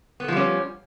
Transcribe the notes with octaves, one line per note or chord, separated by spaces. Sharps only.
F3 G3 B3 C#4 A4